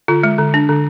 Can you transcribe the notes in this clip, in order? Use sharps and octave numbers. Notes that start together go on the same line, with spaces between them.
D3 F4
G#3
D3
D4
D3